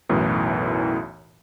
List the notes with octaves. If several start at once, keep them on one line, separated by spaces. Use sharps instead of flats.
B1 F#2 A2 E3